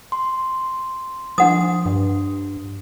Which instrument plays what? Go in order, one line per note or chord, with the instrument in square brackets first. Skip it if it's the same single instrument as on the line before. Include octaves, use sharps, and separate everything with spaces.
[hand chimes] C6
[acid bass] F3 [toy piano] D4 F#5 D#6
[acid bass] G2